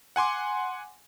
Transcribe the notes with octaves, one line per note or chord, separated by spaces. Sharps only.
F#5 G#5 C6 D6